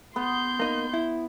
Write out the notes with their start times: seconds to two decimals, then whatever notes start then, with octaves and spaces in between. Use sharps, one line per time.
0.16 B3 C6 G6
0.60 A#3 D#4
0.94 E4